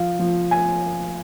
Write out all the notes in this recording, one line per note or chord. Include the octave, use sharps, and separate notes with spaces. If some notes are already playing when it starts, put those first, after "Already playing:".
Already playing: F3 F5
F3
G#5